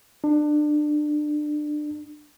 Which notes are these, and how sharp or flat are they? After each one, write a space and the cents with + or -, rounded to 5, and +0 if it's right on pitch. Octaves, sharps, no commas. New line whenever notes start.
D4 +25